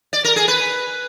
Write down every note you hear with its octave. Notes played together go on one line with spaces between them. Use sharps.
D5
A#4
G#4
B4